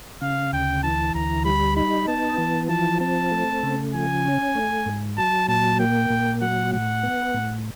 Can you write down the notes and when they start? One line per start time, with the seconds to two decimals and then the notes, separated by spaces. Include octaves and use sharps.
0.22 C#3 F5
0.52 D2 G5
0.83 E3 A5
1.15 D2 A#5
1.45 G3 B5
1.76 D#4 B5
2.08 B3 A5
2.38 E3
2.69 F3 A5
3.00 C4 A5
3.31 A3
3.63 C#3
3.94 F3 G#5
4.25 C#4
4.55 A3
4.86 G#2
5.17 F#3 A5
5.48 A#2 A5
5.80 A#3 G5
6.10 A#2
6.41 F#3 F#5
6.73 A2 F#5
7.03 B3
7.34 A2